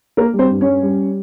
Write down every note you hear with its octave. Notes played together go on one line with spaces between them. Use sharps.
A#3 A#4
G3
C4 C5
G2
C#4 C#5
G3
G3